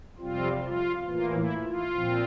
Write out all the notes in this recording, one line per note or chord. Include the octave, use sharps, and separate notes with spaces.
F2 C3 G3 C4 F4
F4
A2 E3 A#3 F4
E4
F4
A#2 F3 C4